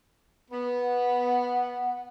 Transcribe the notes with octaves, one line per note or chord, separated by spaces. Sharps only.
B3
F#5